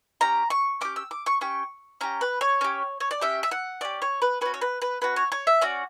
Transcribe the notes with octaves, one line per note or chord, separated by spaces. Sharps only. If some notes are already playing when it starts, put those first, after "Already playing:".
C#4 G4 A#5
C#6
C#4 G4 D6
E6
D6
C#6
C#4 G4 C#6
C#4 G4 A#5
B4
C#5
C#4 G4
C#5
D5
C#4 G4 E5
E5
F#5
C#4 G4 D5
C#5
B4
C#4 F#4 B4
C#5
B4
B4
C#4 F#4 B4
C#5
C#5
E5
C#4 F#4 D5